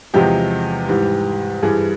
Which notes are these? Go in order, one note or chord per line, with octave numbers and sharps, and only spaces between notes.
E2 C3 F3 G#3 G4
G#2 E3 G3
G2 E3 G3 G#4